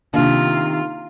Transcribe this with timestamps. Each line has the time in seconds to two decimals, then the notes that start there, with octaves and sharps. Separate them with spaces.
0.14 C3 D#3 A#3 D4 F4